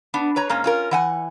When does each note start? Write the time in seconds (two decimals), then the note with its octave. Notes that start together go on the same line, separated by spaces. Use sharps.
0.14 B3 D4
0.36 B4 C#5 A#5
0.49 G#2 A#3 C#4
0.64 C#4 F4 A#4
0.91 E3 F#5 G#5